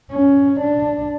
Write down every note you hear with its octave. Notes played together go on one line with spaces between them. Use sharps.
C#4
D4